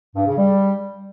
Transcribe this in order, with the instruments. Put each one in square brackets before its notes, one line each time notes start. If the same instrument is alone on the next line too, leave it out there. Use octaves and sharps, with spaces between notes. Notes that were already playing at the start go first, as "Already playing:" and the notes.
[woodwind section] G2
C#3
G3